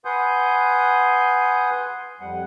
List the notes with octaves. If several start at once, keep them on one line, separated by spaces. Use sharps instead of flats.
B4 F#5 G#5 C6 D#6 G6
F2 G3 F#5